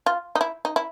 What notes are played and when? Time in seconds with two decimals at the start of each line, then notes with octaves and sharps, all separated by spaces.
0.06 F4
0.35 D#4
0.41 E4
0.65 D#4
0.76 E4